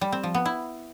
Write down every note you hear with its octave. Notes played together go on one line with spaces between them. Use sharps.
G3
C4
F3
B3
E4